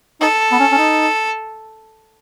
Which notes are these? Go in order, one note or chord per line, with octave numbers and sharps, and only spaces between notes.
D#4 A4
B3
C#4
C#4
D#4